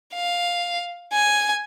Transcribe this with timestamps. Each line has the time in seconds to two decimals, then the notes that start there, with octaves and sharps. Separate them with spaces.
0.14 F5
1.13 G#5